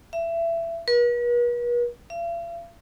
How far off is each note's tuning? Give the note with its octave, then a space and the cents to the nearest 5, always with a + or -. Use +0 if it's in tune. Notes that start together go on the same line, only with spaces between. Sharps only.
E5 +25
B4 -45
F5 -45